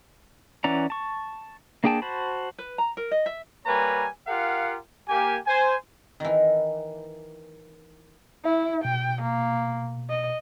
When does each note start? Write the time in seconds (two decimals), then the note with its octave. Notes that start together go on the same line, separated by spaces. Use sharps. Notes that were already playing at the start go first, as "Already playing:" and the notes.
0.64 E3 C#4 D5 F#5 A#5
0.90 A5 C#6
1.84 A#3 D4 G#4 G5 A5
2.02 F#4 C5 A5 B5
2.58 B4
2.78 A#5
2.97 A#4
3.11 D#5
3.26 E5
3.66 G3 A#3 B4 C#5 G#5 A#5
4.27 F4 G4 A#4 F5 F#5
5.09 A#3 G4 G#5
5.47 C5 G#5
6.20 D#3 E3
8.45 E4 E5
8.85 B2 G5
9.22 A#3
10.10 D#5